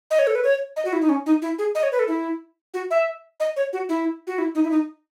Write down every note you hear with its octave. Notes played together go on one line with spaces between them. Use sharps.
D#5
C#5
A4
B4
C#5
D#5
F#4
E4
D#4
C#4
D#4
E4
G#4
D#5
C#5
B4
A4
E4
F#4
E5
D#5
C#5
F#4
E4
F#4
E4
D#4
E4
D#4